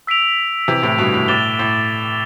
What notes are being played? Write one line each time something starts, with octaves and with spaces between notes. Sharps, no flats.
E6 B6 D7 F7
C3 E3
A2 C3
G2 B2
A2
A2 D6 A6 E7 G7
A2